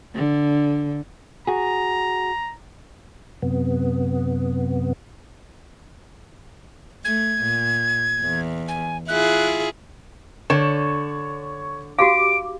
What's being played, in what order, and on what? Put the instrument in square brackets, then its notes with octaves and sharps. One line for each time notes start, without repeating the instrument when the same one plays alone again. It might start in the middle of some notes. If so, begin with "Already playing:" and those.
[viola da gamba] D3
[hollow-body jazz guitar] F#4 G#4 [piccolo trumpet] A#5
[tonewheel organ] F#2 C3 B3
[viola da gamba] A3 [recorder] G#6
[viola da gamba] A#2
E2
[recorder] G#5
[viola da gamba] E4 F4 G#4 [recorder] F#6
[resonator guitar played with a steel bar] D3 [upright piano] C#5 C#6 E7
[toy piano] F#4 G4 F5 [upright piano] D6 [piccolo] D7